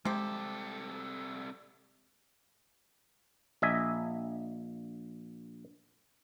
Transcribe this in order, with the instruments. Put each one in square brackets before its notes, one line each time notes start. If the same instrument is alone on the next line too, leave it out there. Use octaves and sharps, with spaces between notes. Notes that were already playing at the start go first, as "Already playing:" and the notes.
[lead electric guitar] C2 A4 [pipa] C3 G4 [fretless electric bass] G#3
[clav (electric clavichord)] A#1 D#5 E5 G#5